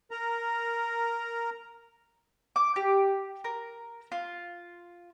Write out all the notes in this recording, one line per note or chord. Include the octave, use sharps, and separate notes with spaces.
A#4 A#5
D6
G4
A#4
F4